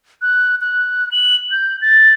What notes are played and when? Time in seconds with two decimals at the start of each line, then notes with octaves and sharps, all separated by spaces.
0.22 F#6
0.61 F#6
1.12 F#7
1.51 G6
1.81 A6